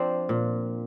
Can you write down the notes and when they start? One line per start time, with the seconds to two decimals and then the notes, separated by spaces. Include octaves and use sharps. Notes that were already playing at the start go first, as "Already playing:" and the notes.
Already playing: F3 C4 D4
0.29 A#2